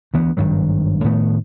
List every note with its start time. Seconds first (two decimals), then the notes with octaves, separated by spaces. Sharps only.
0.14 D2 E3 B3
0.37 G#1 G2 D#3 F#3
1.04 A2 D#3 A3 B3